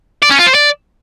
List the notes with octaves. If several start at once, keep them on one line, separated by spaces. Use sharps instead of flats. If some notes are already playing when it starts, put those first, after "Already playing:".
D5
C#4
F4
C5
D5